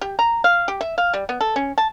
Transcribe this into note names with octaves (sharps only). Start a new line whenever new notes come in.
G4
A#5
F5
G4
E5
F5
G3
B3
A4
C#4
A5